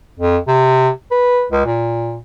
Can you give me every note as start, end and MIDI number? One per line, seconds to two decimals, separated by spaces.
0.19 0.37 41
0.48 0.89 48
1.11 1.46 71
1.52 1.62 37
1.65 2.19 46